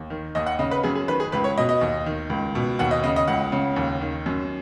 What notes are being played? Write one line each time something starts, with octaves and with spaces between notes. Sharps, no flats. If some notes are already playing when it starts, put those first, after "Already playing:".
Already playing: D#2
D#3
D#2 D#5
F#5
C#3 D#5
B4
F#2 G#4
G#4
D#3 B4
G#4
C#2 B4
C#5
B2 D#5
D#5
D#2
D#3
C#2
B2
D#2 F#5
D#5
C#3 D#5
D#5
C#2 F#5
C#3
D#2
D#3
F#2